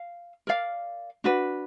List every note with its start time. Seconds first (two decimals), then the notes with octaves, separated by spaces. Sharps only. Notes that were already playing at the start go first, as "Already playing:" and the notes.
Already playing: F5
0.47 A#4 D5 F5
1.24 D4 F#4 B4